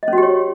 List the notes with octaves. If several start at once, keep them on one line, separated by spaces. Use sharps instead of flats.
D#5
C#4
F#4
G4
C#5